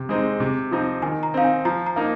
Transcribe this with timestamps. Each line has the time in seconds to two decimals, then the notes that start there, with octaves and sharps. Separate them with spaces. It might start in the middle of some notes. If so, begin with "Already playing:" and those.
Already playing: C3
0.09 G#3 C4 D#4
0.40 C3
0.71 F3 C4 D#4
1.02 D#3 G#5
1.23 A#5
1.34 C4 D#4 F5
1.44 G#5
1.65 F3 A#5
1.86 A#5
1.96 A#3 D#4